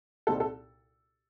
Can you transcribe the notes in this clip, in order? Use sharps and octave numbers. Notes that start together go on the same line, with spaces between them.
C2 A#2 G3 C4 D#4 A4
A4